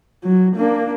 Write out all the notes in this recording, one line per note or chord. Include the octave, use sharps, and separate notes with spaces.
F#3
A#3 D4